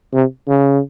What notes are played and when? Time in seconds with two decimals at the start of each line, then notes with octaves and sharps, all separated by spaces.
0.13 C3
0.48 C#3